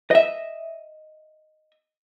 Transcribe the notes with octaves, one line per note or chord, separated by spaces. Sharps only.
D#5 E5